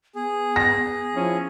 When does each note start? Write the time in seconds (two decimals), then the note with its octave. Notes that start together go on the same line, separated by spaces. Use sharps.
0.15 B3 G#4
0.56 A#6
1.15 F3 C#4 E4